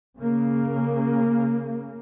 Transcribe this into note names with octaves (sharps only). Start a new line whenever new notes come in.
C#3 A#3